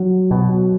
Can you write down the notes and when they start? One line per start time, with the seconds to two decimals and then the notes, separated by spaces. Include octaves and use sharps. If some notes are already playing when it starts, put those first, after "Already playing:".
Already playing: F#3
0.31 B2